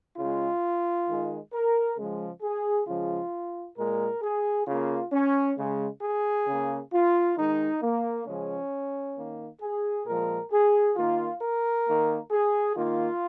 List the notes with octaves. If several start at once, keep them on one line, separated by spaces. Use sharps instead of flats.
C#3 G#3 F4
D#3 G#3
A#4
C#3 F3 G#3
G#4
C#3 F3 G#3 F4
A#2 G#3 A#4
G#4
C#3 A#3 F4
C#4
C#3 G#3
G#4
C#3 A#3
F4
D#3 G#3 D#4
A#3
C#3 F3 G#3 C#4
D#3 A#3
G#4
A#2 F3 G#3 A#4
G#4
D#3 A#3 F4
A#4
D#3 A#3
G#4
D#3 A#3 F4